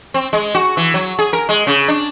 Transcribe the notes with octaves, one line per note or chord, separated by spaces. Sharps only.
C4
G#3
F#4
E3
F#3
G#4
A#4
G#3
C#3
D4